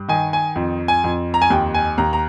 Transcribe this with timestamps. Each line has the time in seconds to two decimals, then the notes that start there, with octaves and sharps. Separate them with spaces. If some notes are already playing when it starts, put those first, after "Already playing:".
Already playing: G2
0.08 D#3 G#5
0.33 G#5
0.56 F2
0.88 G#5
1.04 F2
1.34 A#5
1.42 G#5
1.50 D#2 G5
1.74 G#5
1.98 D#2 A#5
2.13 A#5